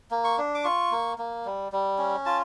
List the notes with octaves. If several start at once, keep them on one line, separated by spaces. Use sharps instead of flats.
A#3
C#6
D4
D6
F4 C#6
A#3
A#3
G3
G3
C#4
F4 A5